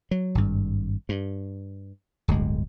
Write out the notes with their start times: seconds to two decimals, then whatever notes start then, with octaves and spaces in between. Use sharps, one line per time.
0.11 F#3
0.35 G#1 G2
1.09 G2
2.28 D1 G1 D2 G#3